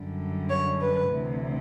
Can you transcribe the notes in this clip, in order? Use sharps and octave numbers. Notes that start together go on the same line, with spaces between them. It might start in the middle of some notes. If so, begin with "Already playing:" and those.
Already playing: F#2 D3 G3
C#5
B4
D2 C3 E3